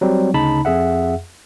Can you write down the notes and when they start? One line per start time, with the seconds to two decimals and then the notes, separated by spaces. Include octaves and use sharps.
0.01 F#3 G3 C4
0.34 D2 C#3 D#4 A5 B5
0.65 F2 G#4 E5 F#5